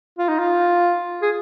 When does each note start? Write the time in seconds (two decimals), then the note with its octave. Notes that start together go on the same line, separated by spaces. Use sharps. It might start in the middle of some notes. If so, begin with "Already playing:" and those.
0.18 F4
0.29 D#4
0.39 F4
1.22 G#4